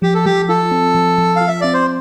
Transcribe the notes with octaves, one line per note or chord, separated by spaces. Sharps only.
F3 G4
A4
F3 G4
F4 A4
C4
F3
F3
F4 F5
E5
C4 D5
C5